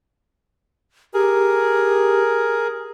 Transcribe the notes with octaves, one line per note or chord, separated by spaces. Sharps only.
G4 G#4 A#4